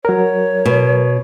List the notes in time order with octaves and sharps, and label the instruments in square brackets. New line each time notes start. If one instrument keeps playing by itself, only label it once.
[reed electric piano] F#3 A#4 [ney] C#5
[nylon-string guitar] B2